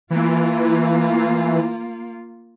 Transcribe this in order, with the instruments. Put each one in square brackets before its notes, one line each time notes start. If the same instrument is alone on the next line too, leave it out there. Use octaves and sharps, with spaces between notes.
[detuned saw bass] E3 [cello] A#3 F4